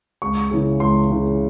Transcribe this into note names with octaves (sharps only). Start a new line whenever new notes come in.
C#2 C#6
C#3 E3
C#2 C6
C#3 E3